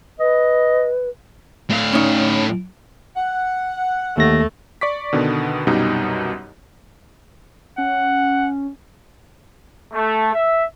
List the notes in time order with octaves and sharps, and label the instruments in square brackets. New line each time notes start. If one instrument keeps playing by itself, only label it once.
[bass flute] B4 [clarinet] D#5
[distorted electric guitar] A2 F5
[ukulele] C#4 D#4
[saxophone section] F#5
[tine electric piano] D#2 A#6 [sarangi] A3
[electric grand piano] D5 C#6 D6 B6
B2 D3 D#3 B3
C2 F#2 B2 G3 D#4
[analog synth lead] C#4 [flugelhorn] F#5
[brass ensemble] A3
E5